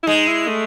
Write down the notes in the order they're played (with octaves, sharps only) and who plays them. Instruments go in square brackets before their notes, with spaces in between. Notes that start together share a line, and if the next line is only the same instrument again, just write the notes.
[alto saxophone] E4
[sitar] G#3 [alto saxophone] D#4
[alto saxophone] E4
A3